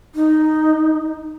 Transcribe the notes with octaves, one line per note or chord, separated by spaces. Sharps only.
D#4